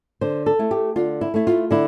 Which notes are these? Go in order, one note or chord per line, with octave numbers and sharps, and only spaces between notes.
D3 C5
A4
A3 E4
G4
D3 F4
E4
A3 E4
F4
D3 E4